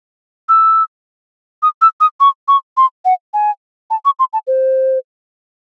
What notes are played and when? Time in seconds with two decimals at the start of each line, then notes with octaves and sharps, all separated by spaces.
0.49 E6
1.63 D#6
1.82 E6
2.01 D#6
2.20 C#6
2.48 C#6
2.77 C6
3.05 F#5
3.34 G#5
3.90 A5
4.05 C#6
4.19 C6
4.33 A5
4.47 C5